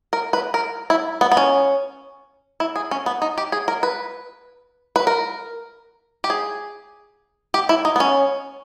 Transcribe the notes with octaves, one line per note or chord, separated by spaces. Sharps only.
A#4
B4
A#4
E4
B3
B3
C#4
E4
G#4
C#4
B3
D#4
G4
G#4
A#4
B4
B4
A#4
G4
G#4
G4
E4
D#4
B3
C#4